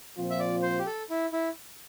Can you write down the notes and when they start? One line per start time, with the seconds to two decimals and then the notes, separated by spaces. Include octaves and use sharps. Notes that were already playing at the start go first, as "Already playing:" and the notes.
0.17 A#2 F3 C4 F4
0.30 E5
0.39 D5
0.62 C5
0.79 G4
0.86 A4
1.10 E4
1.33 E4